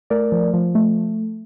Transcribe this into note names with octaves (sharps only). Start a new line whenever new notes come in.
A3 A#4 D5
F3
F3
A3